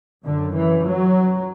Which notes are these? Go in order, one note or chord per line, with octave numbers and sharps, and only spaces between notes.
F#2 D3
E3
F#3